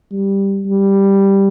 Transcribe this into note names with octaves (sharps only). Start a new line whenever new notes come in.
G3
G3